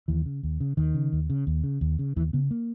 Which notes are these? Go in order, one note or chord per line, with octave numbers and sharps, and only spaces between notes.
D#2 E3
C#3
D#2
C#3
D#2 D#3
C#3
D#2
C#3
D#2
C#3
D#2
C#3
D#2 E3
C#3 B3
A#3